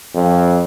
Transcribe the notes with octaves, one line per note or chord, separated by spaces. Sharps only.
F2